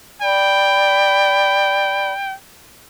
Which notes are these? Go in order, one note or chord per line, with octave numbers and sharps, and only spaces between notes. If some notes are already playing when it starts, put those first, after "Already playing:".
D5 G5 B5